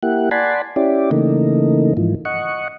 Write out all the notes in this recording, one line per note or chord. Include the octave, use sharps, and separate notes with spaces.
A#3 E4 G4 F#5
D5 F#5 G#5 A5 B5 C6
C#4 E4 G4 D5
C#3 E3 A3 A#3 D#4
G#2 E3 F3
D#5 F#5 C#6